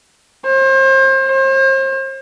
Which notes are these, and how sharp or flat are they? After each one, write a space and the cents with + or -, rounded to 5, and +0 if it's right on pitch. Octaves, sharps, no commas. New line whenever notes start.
C5 +35
C5 +40